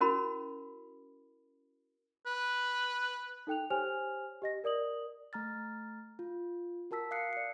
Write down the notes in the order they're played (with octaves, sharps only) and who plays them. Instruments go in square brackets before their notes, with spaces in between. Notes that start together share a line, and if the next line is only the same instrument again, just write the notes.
[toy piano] C#4 E4 F#4 A#4 B5
[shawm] B4
[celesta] D#4 A4 G5 F#6 F7
G4 C5 C#5 G#5 F6 F7
G4 D#5 A#6
A#4 D5 D#6 F#7
[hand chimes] A3 A#5 F6 A6
F4
F#4 A#4 A5 E6 B6
F5 D#6 F#6 C7 C#7
D5 C#7